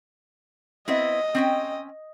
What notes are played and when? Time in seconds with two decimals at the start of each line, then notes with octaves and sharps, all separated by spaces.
0.88 B3 C4 E4 D#5
1.35 C4 C#4 G5